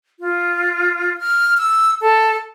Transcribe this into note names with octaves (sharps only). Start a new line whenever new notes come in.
F4
F6
E6
A4